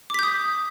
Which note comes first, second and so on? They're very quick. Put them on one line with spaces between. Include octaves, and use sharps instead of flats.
D6 B6 G6 D#6